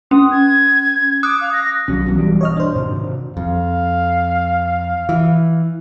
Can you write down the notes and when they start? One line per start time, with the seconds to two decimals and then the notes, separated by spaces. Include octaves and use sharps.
0.11 C#4 D#6
0.31 G#6
1.23 D6 D#6 F#6
1.41 F5
1.52 A#6
1.88 B1 D#3 F#3 C#4
2.05 G2 B2 E3
2.19 G3
2.41 C#5 D#5 F6
2.56 D4 C5
2.76 G#2 C3 D#3
3.37 F2 F5
5.09 E3